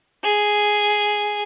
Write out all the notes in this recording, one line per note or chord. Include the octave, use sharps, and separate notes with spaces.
G#4